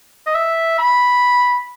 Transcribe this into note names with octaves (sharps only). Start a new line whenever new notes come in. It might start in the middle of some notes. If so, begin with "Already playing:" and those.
D#5
E5
B5